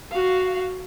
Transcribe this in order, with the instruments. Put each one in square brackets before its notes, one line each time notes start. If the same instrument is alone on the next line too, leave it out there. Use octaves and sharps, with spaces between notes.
[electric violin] F#4 F5